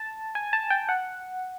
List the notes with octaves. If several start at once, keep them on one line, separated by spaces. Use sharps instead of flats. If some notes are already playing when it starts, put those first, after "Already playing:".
Already playing: A5
G#5
A5
G5
F#5